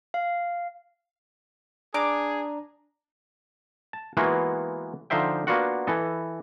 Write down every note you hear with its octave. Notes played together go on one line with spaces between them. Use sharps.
F5
D4 G#4 A#5 D6
A5
E3 G#3 A#3 B3 F4 F#4
D3 F3 D#4 C5 E5 G5
A#3 B3 D4 F4 F#4 F#5
E3 E4 A4 D#5